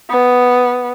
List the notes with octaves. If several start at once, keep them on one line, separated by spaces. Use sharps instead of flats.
B3